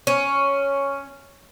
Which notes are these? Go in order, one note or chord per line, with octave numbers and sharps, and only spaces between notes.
C#4